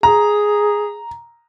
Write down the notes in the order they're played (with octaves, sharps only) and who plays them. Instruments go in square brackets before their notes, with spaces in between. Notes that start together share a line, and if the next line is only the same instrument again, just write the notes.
[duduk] G#4 [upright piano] A#5